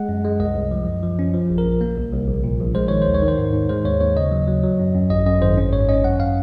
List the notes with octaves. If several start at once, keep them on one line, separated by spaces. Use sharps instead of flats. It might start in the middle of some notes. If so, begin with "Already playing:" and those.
Already playing: G#3 F#5
F#2
G#3
C2 D#5
C2
F3
F#2
F3
C#4
F3
A#1
A#4
A#1
A#3
C2
C2
A#1
A#2
A#1
G#3 C5
D#3 C#5
D#2 C5
C#5
D#3
C5
G#2
G#2
G#3 C5
D#2 C#5
D#2 C#5
C#3 D#5
F#3
F#3
F#3
F#2
F#2
G#1 D#5
F#2 D#5
G#1 C5
C#4
G#2 C#5
C#4 D#5
F#2 F#5
F5